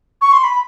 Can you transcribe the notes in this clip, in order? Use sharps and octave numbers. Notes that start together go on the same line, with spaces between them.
C#6
C6
B5